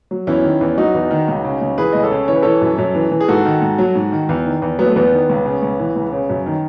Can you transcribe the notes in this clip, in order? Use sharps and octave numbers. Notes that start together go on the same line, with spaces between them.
F#3
E2 C#4 E4
D#3
E2
F#3 D#4 F#4
E2
D#3
C#2
C#3
C#2
E3 G#4 B4
C#2 D#5
A4 C#5
C#3
E3 C#5
B4
E3 A4 C#5
F#2
F#2
E3
E3
G#4
G#2 F#4 A4
D#3
G#2
F#3
G#2
D#3
E2
D#3
E2
F#3 B3
A3
E2 B3
D#3
C#2
C#3
C#2
E3
C#2
C#3
F#2
D#3